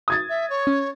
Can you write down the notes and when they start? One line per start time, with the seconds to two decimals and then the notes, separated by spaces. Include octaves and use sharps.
0.08 D#6 G#6 A6
0.29 E5
0.50 C#5
0.67 C#4